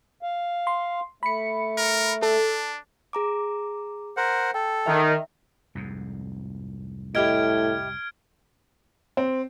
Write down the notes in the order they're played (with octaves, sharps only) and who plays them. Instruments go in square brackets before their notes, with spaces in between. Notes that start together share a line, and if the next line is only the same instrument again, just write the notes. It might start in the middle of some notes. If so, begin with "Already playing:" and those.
[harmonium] F5
[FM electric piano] C6
[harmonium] A3 [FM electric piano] B5 C#7
[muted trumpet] A#4
[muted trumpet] D4 [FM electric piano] A4
[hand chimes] G#4 A#5 D6
[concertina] A#4 C5 F#5
[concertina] A4 [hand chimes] G5
[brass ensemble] D#3 [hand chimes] E5
[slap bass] C2 F2 G#2
[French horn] A2 [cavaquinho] E4 G4 D#5 [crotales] F6 G#6 D7
[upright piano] C4